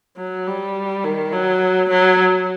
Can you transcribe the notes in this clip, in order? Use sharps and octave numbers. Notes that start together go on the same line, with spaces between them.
F#3
G3
D#3
F#3
F#3